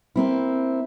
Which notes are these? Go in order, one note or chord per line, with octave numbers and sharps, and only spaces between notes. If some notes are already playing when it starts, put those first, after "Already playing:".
A#3 C4 E4